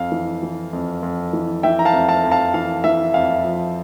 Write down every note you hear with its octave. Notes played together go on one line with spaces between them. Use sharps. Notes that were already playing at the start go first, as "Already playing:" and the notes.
Already playing: F2 F5
E3
E3
F2
F2
E3
E3 E5 G5
A#5
F5 A5
F2
F5 A5
F2
F5 A5
E3 F5
E3 E5
F2 F5
F3